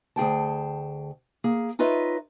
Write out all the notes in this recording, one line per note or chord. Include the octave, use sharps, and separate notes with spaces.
D2 G#4 G5 A5
A#3 G#4
D#4 F4 B4 C#5 D#5 E5